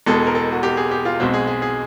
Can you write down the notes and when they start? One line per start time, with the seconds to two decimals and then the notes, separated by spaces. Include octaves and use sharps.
0.06 E1 E2 B2 G#3 A4
0.27 A#4
0.35 A4
0.52 F#4
0.63 G4
0.77 G#4
0.91 G4
1.05 F4
1.20 B1 B2 G#3 C4 F#4
1.34 G#4
1.47 G#4
1.62 G#4